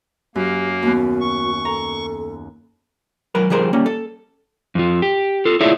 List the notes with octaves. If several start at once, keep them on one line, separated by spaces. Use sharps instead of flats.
F#2 A#3 G4
D#2 B3 F#4
C#6
A4 A#5
F#3 A#4 B4
F3 G3 G#4 A#4 C5
G3 A#3 C#4
A4
F2 F3
G4
F4 A4
E4 F4 G#4 C#5 D5 E5